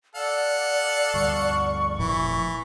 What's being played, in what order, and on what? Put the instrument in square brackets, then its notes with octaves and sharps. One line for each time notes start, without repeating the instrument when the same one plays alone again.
[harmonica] A4 F5 F#5 [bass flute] D5
[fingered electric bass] D2 G2 [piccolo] C#6
[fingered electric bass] F1 A#2 F3 [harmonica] E3